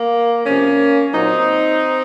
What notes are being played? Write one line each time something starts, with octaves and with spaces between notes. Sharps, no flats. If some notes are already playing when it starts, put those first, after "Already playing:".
Already playing: A#3
C3 F3 A#3 C#4
A#2 F#3 C4 D#4